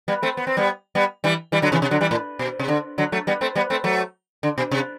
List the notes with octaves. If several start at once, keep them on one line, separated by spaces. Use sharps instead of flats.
G3 B3
A3 C4
B3
C4
G3 B3
G3 B3
E3 G3
E3 G3
D3 F#3
C3 E3
C3
D3 F#3
E3 G3
A2
B2
C3
D3
D3 F#3
F#3 A3
G3 B3
A3 C4
G3 B3
A3 C4
F#3 A3
D3
B2
C3